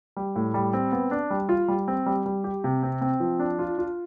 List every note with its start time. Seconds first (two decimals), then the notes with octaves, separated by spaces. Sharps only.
0.17 G3
0.36 A2
0.54 G3
0.73 C4
0.92 B3
1.11 D4
1.30 G3
1.49 F4
1.68 G3
1.88 C4
2.06 G3
2.26 G3
2.44 G4
2.64 C3
2.83 C4
3.01 C4
3.20 F3
3.39 D4
3.59 F4
3.78 F4